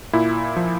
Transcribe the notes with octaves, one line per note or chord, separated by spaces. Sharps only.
A#2 E4
F3